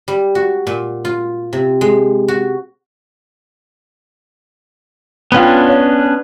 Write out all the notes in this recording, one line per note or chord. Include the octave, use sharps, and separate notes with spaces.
G3
F#4
A#2
F4
C3
G#3
F#4
B3 C#4 D4 F4 G5 B5
C#5